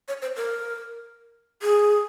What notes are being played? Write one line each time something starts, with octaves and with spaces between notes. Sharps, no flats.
C#5
C5
A#4
G#4